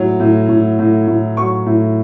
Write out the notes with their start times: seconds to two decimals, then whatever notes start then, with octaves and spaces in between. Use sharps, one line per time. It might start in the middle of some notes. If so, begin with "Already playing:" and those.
Already playing: A2 F#3
0.20 A2
0.49 A2
0.79 A2
1.07 A2
1.37 F#3 C#6
1.66 A2